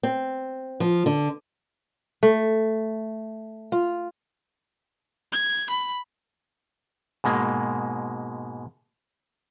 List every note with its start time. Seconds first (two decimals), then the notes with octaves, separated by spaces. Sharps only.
0.03 C4
0.80 F3
1.06 D3
2.23 A3
3.72 F4
5.32 G#6
5.70 B5
7.24 G#2 B2 G#3 A#3